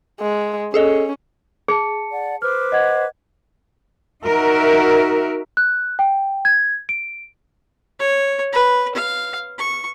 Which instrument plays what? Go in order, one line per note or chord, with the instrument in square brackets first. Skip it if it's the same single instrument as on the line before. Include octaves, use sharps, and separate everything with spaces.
[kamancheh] G#3
[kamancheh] C#4 [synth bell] G#4 A4 D#5
[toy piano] G#4 [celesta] A5 C#7
[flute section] D5 F#5
[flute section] B4 C5 D6 [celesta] F6
[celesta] D#5 F#5 G#6
[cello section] D#4 F#4 A#4 E5
[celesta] F#6
G5
G#6
D7
[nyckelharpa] C#5
B4
F5
C#6